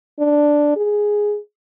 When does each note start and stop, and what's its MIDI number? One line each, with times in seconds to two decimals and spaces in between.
0.19 0.76 62
0.76 1.38 68